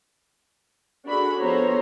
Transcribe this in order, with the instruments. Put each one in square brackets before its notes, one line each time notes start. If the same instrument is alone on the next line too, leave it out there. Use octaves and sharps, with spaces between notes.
[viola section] D4 F#4 G#4 A4 B5
F3 B3 A4 C5 C#5 A#5